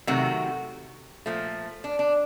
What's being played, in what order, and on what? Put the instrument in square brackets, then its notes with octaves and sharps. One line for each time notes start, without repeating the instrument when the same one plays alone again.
[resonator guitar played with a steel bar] C3 D#3 F#3 A3 F#4
A#2 F3 A3
D4
D4